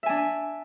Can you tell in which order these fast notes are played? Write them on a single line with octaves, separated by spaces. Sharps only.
E5 G#5 D4